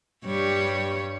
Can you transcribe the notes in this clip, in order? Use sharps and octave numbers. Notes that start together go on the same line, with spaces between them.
G2 G3 C#5